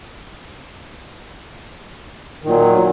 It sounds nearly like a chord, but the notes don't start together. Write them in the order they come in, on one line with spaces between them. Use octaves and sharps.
D#3 A#2 F#3